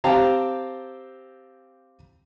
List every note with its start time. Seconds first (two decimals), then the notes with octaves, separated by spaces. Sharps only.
0.04 C4 G4 F5 G5 A5 A#5